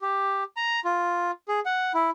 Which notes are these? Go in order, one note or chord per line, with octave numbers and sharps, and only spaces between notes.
G4
A#5
F4
G#4
F#5
E4